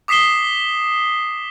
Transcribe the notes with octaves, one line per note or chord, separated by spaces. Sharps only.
D6 D#6 B6 C7 E7 G7